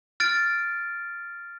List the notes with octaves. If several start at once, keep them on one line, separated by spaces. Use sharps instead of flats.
F6 A6 D7